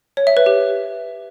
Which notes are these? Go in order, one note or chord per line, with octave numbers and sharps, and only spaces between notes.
C#5
E5
B4
G4